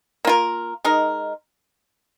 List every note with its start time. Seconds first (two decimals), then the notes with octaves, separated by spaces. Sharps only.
0.25 A#3 F4 A#4
0.85 G#3 D#4 A#4